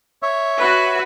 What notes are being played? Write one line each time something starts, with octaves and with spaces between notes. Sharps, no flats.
C#5 E5
F#4 B4